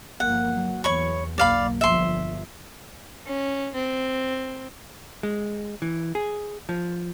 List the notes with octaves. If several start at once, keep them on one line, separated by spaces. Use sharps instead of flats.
G1 F3 A#3 F#5
F#3
E2 C#5 B5 C#6
F#1 B1 A#3 D5 F5 B5
G1 F3 E5 C6
C#4
C4
G#3
E3
G#4
F3